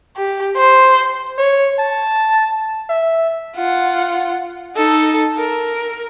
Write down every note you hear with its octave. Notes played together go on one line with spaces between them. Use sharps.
G4
C5
C#5
A5
E5
F4 F#5
D#4 A4
A#4